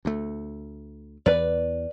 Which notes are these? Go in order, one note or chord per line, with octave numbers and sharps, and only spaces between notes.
D2 A3
E2 B4 D5